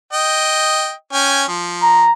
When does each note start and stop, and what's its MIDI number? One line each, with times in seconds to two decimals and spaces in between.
0.13 0.92 75
0.13 0.92 79
1.13 1.44 61
1.13 1.44 79
1.13 1.44 80
1.48 2.04 53
1.83 2.13 82